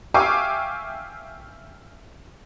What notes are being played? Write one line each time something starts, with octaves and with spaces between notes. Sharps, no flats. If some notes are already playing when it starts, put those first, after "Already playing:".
E5 F5 G5 G#5 C#6 D6